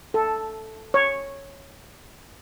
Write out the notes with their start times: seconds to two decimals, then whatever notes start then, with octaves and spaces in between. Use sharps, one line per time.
0.14 A4
0.94 C#5